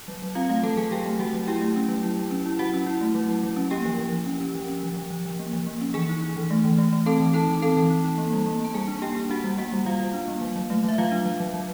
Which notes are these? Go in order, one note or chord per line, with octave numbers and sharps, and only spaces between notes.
F#3
F#3
C4 F4 F5
A3 F4 F5
F#3 A4 A5
F#3 G#4 G#5
F#3 G4 G5
A3
F#3 F#4 F#5
F#3
E4 G4 G5
A3
C#4
F#3
E4
F#3
C#4
E4
F#3 F#4 F#5
C#4
E4
A3
F#3
E4
F#3
C#4
A#3 G4 G5
F3
F3
F3
C#4
C#4
F3
C#4
F3
F3
F3
F3
A#3
F3
A#3
C#4
E3 G#4 G#5
D#4
D#4
E3
A3
E3
A3
A3
C4 A4 A5
E3
D#4 A4 A5
E3
C4 A4 A5
E3
D#4
D#4
A#3
G3
A#3
A#3 A5
G3 G#4 G#5
D4
A#3 G4 G5
D4
D4 F#4 F#5
G3
A#3 F#4 F#5
G3
G3 F4 F5
G3
D4
A#3
F#3
F#3
A3
F#3 E5
F#3 F4 F5
D4
F#3
F#3
F#3